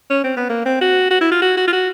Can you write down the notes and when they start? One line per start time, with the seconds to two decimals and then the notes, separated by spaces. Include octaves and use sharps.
0.10 C#4
0.24 C4
0.37 B3
0.49 A#3
0.65 C4
0.81 F#4
1.11 F#4
1.21 E4
1.31 F4
1.42 F#4
1.57 F#4
1.67 F4
1.73 F#4